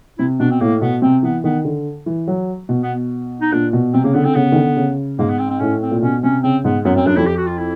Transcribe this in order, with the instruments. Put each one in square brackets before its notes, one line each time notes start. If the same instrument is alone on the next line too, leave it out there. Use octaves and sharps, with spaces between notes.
[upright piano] C3 [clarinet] E4
[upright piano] B2 [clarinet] D4
[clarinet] C4
[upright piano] A2 [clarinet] A#3
[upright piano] B2 [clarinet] B3
[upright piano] C3 [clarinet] C4
[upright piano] E3 [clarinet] B3
[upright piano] D#3 [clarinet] B3
[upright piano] D3
E3
F#3
B2
[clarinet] B3
D#4
[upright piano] A#2 [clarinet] D4
[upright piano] B2
[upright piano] C3 [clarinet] C4
[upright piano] C#3 [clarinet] A#3
[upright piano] D3 [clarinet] B3
[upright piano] D3 [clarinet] C4
[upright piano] C#3 [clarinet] B3
[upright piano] D#3
D3
C#3
[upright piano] G#2 [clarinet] A#3
[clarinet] B3
C4
C4
[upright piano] A2 [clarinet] C#4
[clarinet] C4
[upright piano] A#2
[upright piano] B2 [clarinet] C#4
[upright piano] C3 [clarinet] C#4
[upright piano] C#3 [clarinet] C4
[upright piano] G#2 [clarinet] B3
[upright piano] F#2 [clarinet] B3
[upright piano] F#2 [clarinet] C4
[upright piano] F#2 [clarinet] D4
[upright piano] F2 [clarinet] E4
[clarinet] G4
F#4
F4
E4